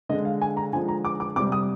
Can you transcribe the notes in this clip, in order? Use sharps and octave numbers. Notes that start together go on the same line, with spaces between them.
D3 G#3 D#5
F5
G#5
A#5
D3 F3 G#3 G#5
A#5
D6
D6
C3 G3 D6
D#6